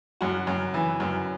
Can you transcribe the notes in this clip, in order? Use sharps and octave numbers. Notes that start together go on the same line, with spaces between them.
F#2 F#4
F#2
E3
F#2